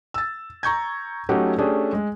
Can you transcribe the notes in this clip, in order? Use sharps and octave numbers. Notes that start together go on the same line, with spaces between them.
E6 A6
A#5 C#6 G6 G#6
F#3 A3 C#4 D#4 G4 F#5
A3 C#4 D4 G4 G#4
G#3